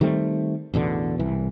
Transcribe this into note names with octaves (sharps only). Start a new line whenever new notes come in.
D#3 G3 A3 C4
A1 E2 B2 D3
C2 E3